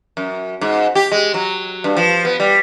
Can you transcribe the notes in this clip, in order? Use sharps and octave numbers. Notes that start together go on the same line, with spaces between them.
F#2
G#2
G4
G#3
F#3
G2
F3
B3
G3